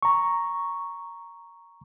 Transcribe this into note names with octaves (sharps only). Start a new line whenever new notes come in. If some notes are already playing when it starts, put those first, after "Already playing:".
A#5 C#6